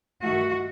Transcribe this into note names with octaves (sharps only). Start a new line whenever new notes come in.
G2 D#3 A3 F#4